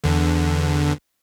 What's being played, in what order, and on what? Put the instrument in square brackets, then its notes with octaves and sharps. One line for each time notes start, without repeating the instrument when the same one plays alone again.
[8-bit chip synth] E2 D3